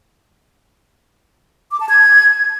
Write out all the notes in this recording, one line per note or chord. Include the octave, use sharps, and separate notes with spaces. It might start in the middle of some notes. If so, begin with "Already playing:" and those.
D6
A5
G#6